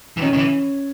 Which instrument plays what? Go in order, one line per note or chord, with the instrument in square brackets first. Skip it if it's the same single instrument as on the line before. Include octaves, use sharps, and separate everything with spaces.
[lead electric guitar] E3
[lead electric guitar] D#3 [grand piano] C#4 C#5
[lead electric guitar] D#3
E3